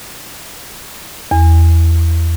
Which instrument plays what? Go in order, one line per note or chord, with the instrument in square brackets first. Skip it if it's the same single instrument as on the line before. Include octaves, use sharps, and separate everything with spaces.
[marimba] E2